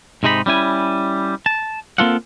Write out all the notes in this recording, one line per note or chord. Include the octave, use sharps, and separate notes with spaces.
G#2 C3 G#3 D#4 B5
G3 C#4 E4 G#5
A5
A#3 C4 F4 A4 F5 F#5